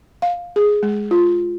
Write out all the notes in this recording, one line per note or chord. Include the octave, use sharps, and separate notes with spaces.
F5
G#4
G#3
F4